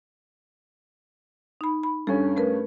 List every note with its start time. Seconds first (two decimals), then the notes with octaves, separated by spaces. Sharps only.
1.61 D#4 B5
1.83 B5
2.07 G2 C#4 A4
2.36 A3 A#4 B4